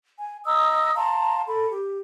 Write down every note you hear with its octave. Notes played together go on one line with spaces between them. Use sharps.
G#5
D#5 A#5 D#6 E6
F5 A5 A#5 C6
A4 B5
G4